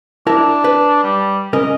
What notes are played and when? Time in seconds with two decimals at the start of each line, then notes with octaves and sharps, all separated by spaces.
0.27 D4 E4 A#4 A5
0.64 B4
1.03 G3
1.53 C#2 C#4 A#4 D#5